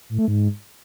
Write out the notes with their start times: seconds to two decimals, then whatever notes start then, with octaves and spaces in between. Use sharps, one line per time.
0.09 A2
0.19 A3
0.28 G#2